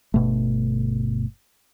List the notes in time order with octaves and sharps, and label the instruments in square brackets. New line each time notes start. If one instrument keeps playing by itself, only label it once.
[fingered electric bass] G1 B2 A3